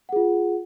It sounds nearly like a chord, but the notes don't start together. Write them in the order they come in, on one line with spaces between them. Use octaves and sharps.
F#5 G#4 F4